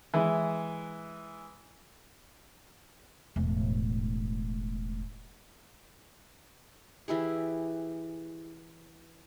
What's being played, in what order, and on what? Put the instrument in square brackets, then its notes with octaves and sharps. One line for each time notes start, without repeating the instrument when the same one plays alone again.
[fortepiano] E3 G#3 E4
[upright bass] E1 A2
[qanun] E3 E4 G4 G#4